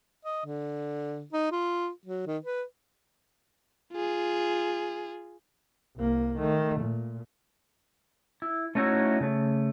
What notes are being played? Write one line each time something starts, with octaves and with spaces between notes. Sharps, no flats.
D#5
D3
D#4
F4
F#3
D#3
B4
F4 G#4
C2 A#3
D#3 A3
A#2
E4
A3 C#4 D#4 E4 F#4 C#5
C#3 A3